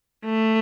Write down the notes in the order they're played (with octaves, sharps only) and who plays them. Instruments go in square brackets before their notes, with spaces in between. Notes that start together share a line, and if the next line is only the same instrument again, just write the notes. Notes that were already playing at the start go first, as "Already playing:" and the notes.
[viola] A3